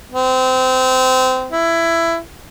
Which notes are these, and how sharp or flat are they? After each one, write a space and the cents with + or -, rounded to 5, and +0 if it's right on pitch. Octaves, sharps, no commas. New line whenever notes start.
C4 -25
E4 +15